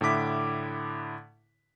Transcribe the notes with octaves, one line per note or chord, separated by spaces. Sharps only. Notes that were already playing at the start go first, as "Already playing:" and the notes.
A2 D3 E4 D6 B6